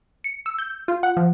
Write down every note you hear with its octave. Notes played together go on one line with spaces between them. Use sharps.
C#7
E6
G6
F4
F#5
F3